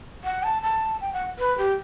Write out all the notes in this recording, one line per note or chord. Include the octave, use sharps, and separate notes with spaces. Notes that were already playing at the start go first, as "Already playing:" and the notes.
F#5
A5
A5
G5
F#5
B4
G4